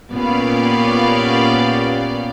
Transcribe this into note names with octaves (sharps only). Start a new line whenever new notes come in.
A#2 B3 C#4 G4 D5 F5